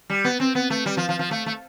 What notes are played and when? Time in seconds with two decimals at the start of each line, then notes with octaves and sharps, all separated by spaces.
0.10 G3
0.24 B3
0.40 C4
0.55 B3
0.70 A3
0.86 G3
0.97 F3
1.09 F3
1.19 F3
1.31 A3
1.46 A3